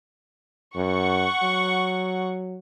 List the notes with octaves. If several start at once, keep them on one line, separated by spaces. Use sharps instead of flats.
F#2 F#5 C#6
F#3